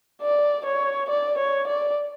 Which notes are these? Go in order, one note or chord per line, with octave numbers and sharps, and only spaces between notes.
D5
C#5
D5
C#5
D5